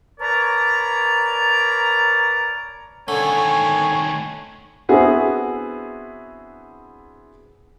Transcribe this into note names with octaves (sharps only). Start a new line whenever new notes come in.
A#4 B4 C#5 D5 A5 A#5
D3 D#3 A3 C#5 G#5
B3 C4 D4 E4 F#4 G#4